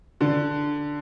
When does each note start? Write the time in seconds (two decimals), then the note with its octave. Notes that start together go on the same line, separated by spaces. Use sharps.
0.21 D3